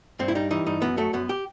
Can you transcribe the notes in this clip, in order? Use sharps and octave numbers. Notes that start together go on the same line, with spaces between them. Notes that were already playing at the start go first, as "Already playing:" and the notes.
G2 C4
E4
G3 D#4
E3 D#4
G2 D#4
F#2 B3
F#3 A3
F#2 B3
G4